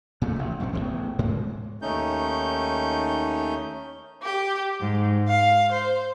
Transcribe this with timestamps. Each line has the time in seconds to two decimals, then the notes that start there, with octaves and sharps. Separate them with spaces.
0.22 A#2 C#3 A3
0.39 A1
0.60 A#1 F#2 C3 C4
0.73 D#1 A1 E2
1.19 G#2 G#3 A#3
1.82 D#2 A3 C#4 D#4 G6
4.22 G4
4.80 G#2
5.26 F5
5.71 C5